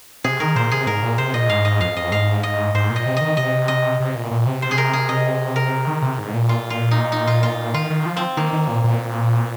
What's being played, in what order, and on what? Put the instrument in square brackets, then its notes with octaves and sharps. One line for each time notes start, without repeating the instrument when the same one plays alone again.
[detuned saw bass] C3 [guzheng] G#4
[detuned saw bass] D#3 [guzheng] A#4
[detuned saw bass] A#2 [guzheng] C5
[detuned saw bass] C3 [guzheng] G#4
[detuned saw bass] G#2 [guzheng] A#4
[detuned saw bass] A#2
[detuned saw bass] C3 [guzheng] C5
[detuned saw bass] A#2 [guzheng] D#5
[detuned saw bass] G#2 [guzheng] F5
[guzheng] D#5
[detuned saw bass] F2 [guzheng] F5
[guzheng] D#5
[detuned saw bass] G#2 [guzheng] F5
[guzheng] D#5
[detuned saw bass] G#2 [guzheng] C5
[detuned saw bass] A#2
[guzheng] D#5
[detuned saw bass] C3
[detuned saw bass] D#3 [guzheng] D#5
[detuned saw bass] C3 [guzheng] D#5
[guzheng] D#5
[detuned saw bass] C3
A#2
A#2
C3
[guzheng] C5
G#4
A#4
G#4
D#5
A#4
[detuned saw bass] D#3
C3
G#2
A#2
[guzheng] F4
F4
D#4
D#4
F4
F4
[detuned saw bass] D#3 [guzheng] F4
[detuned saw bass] D#3
F3
[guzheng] C4
[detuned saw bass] D#3 [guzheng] A#3
[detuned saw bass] D#3
A#2
A#2